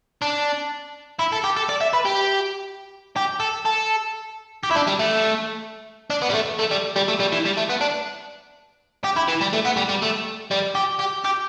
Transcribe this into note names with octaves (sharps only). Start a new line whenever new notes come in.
D4
E4
A4
G4
A4
D5
E5
B4
G4
G4
A4
A4
G4
E4
D4
G3
A3
D4
B3
G3
A3
A3
G3
G3
A3
G3
E3
G3
A3
B3
D4
G4
E4
E3
G3
A3
B3
G3
G3
A3
G3
G4
G4
G4